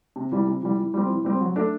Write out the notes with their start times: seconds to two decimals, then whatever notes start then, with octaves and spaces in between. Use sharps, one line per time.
0.16 C3
0.32 E3 G3
0.47 C3
0.62 E3 G3
0.78 E3
0.94 G3 C4
1.09 E3
1.25 G3 C4
1.41 F#3
1.56 A3 D4